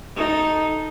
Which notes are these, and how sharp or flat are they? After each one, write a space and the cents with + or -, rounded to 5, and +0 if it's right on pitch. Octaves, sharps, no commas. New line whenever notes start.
D#4 +0 A4 +0